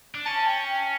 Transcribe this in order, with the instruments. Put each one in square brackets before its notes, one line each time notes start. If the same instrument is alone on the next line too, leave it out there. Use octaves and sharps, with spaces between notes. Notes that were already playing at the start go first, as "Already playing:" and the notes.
[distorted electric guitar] D4
[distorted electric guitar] C#4 [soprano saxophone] A5
[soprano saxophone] G5